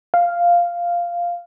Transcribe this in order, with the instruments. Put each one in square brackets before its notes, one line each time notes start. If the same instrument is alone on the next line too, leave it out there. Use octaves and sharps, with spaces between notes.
[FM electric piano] F5